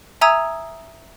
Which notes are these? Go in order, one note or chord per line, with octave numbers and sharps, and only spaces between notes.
E5 G#5 A#5 D#6 E6 G#6